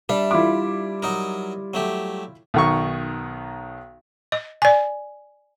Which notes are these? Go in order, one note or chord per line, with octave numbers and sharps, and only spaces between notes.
G3 D4 E5
E4 F4 D6
F#3 D#4 A#4
F#3 A3 G4
B1 D#3 C#6
D#5
D5 G#5